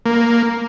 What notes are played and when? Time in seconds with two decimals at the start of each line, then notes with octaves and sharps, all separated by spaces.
0.06 A#3